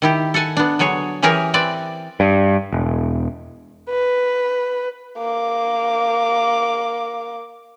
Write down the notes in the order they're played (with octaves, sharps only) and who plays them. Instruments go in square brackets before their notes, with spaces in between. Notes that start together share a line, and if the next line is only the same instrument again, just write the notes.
[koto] D#3 E4 G4
A4 F#5 G#5 A5
B3 D4
D3 F#3 G#4 C#5
E3 C#4 G4 G#4 A#4 G#5
C4 B4 D5 E5
[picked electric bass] G2
E1
[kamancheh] B4
A#3 D6